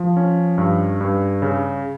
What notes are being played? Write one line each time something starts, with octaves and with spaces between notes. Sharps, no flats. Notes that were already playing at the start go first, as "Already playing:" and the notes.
Already playing: F3
C#4
G2
G2
C#3